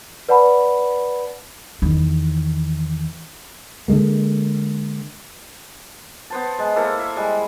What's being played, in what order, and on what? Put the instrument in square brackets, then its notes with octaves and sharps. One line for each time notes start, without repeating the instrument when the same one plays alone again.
[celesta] B4 D5 F#5 A5 B5
[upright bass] E2 D#3
[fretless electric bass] D3 F#3 G#3 A#3
[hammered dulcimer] B3 C5 A5
G#3
A#3 E4 A4 C5
E5
G3 G#3